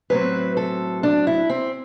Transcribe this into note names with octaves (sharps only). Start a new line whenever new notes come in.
A2 F#3 C4 B4
A4
D4
E4
C4